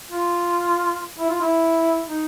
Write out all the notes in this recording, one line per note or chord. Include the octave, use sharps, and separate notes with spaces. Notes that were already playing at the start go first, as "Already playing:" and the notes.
F4
E4
F4
E4
D#4